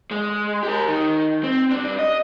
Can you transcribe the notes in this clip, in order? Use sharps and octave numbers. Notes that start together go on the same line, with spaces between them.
G#3
G4 A#4
D#3
C4
G2 D4
D#5